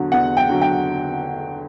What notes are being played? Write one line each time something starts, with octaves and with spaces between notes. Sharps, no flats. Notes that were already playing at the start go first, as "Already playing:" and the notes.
Already playing: E2 D3 F#3
E2 F#5
G5
D3 F#3
G5